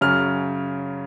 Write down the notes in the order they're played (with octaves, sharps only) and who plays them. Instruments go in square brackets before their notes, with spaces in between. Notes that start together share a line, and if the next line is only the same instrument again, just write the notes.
[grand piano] F#2 C#3 F#3 F6